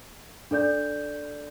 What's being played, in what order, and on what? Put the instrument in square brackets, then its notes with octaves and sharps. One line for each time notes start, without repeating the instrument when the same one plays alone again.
[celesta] D4 A4 D5 G6